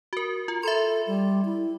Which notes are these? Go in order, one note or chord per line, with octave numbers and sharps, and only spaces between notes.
F#4 A#4
F4
A4 E5 B5 C6
G3
E4